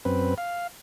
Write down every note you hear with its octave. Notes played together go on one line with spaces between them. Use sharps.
F#2 C4 B4
F5